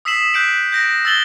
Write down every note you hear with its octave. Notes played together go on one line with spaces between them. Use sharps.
D#6 E6 B6 C7 E7 F#7
F#6 G6 B6 D7 F#7
G6 A#6 D7
E6 A6 F#7 G7